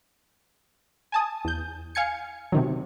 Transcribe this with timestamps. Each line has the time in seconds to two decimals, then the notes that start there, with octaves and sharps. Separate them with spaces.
1.12 G#5 A5 D#6
1.45 E2 G6
1.95 F5 G#5 G#6 C#7
2.52 C3 D#3 F#3